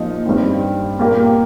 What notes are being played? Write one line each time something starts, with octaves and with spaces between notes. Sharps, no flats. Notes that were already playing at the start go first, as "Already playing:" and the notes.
Already playing: A#2 F3 D#4 G4
G2 G3 C4 D#4
A#2 A#3 G4